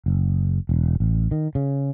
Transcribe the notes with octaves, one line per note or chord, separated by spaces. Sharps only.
F#1
E1
A1
D#3
C#3